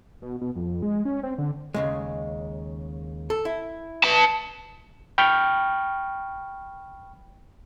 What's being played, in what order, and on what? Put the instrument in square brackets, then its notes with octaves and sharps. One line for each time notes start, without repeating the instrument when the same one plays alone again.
[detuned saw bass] B2
B2
F2
G#3
C#4
C4
D3
[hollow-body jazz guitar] D#2 C#3 G#3
A4
E4
[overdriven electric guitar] B4 A5
[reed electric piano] G5 B5 C#6 F6